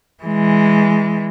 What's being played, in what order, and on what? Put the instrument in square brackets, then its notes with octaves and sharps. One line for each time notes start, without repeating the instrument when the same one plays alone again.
[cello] E3 G#3